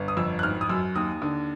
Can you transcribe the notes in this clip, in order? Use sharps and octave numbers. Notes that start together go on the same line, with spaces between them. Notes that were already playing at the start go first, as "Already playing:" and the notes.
Already playing: G1
D#6
F2 E6
F#6
G#1 F6
D#6
F#2 E6
D#2 D#6
D3